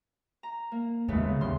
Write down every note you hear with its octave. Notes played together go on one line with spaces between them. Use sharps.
A#5
A#3
D#2 C#3 G#3 A3 B3
C#3
D#2 D3 G3 C6